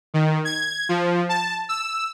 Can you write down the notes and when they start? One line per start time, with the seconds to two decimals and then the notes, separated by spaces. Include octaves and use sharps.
0.14 D#3
0.45 G#6
0.89 F3
1.29 A5
1.69 E6